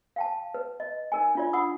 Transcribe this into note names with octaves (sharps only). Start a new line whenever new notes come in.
F5 G5 A5
B4
D#5
D#4 A#4 G#5
D4 F4 D5
F#5 B5 D#6 E6